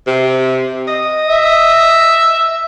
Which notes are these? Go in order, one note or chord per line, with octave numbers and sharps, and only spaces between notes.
C3
D#5
E5